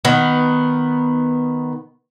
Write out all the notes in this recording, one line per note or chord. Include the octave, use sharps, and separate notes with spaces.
D#3 B3